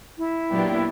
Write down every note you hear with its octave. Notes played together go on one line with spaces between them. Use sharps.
E4
A#2 F#3 B3 D4 G4